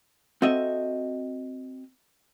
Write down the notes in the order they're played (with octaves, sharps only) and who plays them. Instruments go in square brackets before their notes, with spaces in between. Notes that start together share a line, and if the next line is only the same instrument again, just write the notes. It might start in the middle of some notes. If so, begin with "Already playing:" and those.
[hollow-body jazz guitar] C4 F#4 A4 D#5 E5